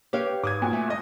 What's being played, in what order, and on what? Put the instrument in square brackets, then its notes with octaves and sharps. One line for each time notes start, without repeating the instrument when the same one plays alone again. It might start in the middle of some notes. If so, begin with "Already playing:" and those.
[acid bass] G4 [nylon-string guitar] B4 C#5 F5
[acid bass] G#2 [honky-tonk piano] D6 D#6 G#6
[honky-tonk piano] A#2 F#4 G#5
[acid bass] A3
[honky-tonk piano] G1 D#5